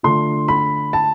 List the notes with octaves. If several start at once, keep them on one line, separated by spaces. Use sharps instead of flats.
D3 A3 D4 F4 C6
B5
A5